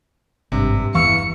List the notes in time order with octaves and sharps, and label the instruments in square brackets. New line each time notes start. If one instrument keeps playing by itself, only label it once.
[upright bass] G#1 [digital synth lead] G2 [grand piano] C3
[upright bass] E2 B3 [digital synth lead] E3 [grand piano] F5 C#6 E6 [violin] C#7